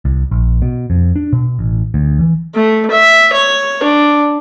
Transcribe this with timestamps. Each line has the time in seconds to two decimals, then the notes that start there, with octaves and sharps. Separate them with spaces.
0.05 C2
0.31 A#1
0.62 B2
0.90 F2
1.16 D4
1.33 B2
1.59 A1
1.94 D2
2.19 E3
2.55 A3
2.91 E5
3.33 C#5
3.84 D4